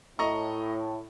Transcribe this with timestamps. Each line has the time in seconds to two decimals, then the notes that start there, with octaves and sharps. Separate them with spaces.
0.19 A2 D#5 A#5 C#6